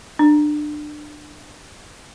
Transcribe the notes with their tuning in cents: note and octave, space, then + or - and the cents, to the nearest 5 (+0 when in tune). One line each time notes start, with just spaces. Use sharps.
D4 +25